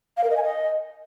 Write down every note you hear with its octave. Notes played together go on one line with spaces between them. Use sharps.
F5
A#4
D#5
G#5
D#5